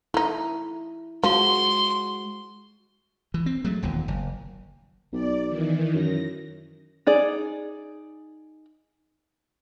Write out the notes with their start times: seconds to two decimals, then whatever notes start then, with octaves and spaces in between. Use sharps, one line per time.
0.14 A3 D#4 E4
1.23 F3 G#3 F#4 C6
3.34 E3
3.46 C4
3.65 F#3 G#3 A3
3.82 E1 D#2 A#2
4.08 F#1
5.13 B1 D5
5.47 D#3 E3
5.94 F#2 A#6
7.07 D#4 G#4 D5